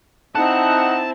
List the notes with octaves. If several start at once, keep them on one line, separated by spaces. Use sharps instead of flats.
C4 D#4 E4 F#5 A5